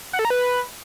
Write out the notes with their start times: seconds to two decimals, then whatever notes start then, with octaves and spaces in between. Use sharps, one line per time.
0.13 F#5
0.19 A4
0.25 A#5
0.30 B4